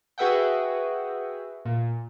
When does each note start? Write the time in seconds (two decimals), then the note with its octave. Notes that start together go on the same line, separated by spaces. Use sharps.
0.18 F#4 G#4 B4 E5 F#5 G5
1.65 A#2